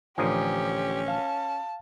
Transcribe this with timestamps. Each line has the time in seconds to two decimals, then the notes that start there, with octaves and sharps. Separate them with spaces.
0.18 A1 D3 F3 C#4 G4 G#5 A#5 D#6
1.08 F5 A5